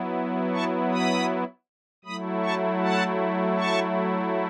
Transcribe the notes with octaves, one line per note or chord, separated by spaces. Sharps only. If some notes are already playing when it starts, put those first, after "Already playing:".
Already playing: F#3 B3 E4
A5 C#6
B5 D#6
F#3 A3 E4 B5 D#6
A5 C#6
F#5 A5
A5 C#6